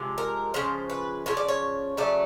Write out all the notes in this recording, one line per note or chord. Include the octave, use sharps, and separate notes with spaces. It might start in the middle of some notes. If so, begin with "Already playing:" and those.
Already playing: C3 F3 G#3
A#4
C#3 F3 G#3 C5
B4
C#3 F3 C#5
D5
C#5
C#3 F#3 A3 D5